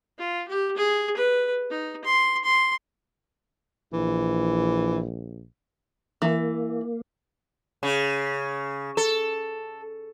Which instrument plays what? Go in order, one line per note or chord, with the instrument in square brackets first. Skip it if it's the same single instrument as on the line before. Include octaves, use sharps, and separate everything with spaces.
[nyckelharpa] F4
G4
G#4
B4
D#4
C6
C6
[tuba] A#1 [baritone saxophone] E3
[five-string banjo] E3 [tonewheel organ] A#3
[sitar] C#3
A4